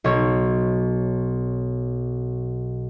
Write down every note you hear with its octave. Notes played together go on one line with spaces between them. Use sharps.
B1 C#5